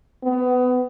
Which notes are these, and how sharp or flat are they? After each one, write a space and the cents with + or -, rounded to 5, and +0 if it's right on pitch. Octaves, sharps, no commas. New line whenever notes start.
B3 +25